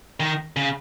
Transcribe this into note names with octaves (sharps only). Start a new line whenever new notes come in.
D#3
C#3